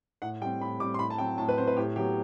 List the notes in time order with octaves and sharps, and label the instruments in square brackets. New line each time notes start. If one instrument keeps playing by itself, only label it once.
[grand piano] A2 F#5
G3 G5
C4
A2 B5
G3 D6
C4
C6
A2 B5
A5
F#3 C4 G5
A2 A5
B4
F#3 C4 C5
B4
A2 G4
F#3 B3 G4